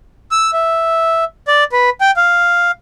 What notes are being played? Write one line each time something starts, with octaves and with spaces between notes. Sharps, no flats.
E6
E5
D5
B4
G5
F5